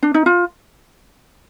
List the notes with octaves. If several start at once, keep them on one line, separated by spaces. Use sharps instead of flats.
D4
D#4
F4